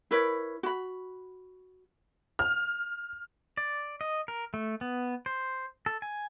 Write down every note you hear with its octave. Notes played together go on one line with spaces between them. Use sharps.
E4 A#4 B4 C#5
F#4 B5
F6
D5
D#5
A#4
A3
B3
C5
A4
G#5